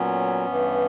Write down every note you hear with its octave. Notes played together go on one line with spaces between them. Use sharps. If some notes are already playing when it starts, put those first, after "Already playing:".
Already playing: A#2 F#3 B3 C#4
G2 E3